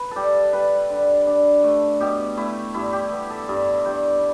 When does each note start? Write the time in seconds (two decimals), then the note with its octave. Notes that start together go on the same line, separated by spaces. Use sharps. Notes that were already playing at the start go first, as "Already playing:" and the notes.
Already playing: B4
0.11 G3 G4 A4
0.53 G3 B4
0.90 D3
1.27 D4
1.64 A3
2.00 B2 G4
2.37 A3 E4
2.74 G2 E4
2.93 G4
3.11 B3
3.30 A4
3.48 G2 E5
3.85 G3 G5